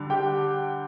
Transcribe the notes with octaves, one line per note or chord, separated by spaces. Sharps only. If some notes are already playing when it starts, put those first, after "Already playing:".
Already playing: D3 G3 D4
G4 G5